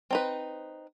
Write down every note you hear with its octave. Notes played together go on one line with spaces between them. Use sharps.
C4 D#4 B4